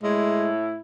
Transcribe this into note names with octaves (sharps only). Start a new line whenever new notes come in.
A2 G#3 E4